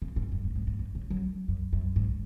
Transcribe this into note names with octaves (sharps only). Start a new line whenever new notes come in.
C#3
G#2
F#2
G#2
G#2
G#2
G#2
C#3
F#3
F#2
F#2
G#2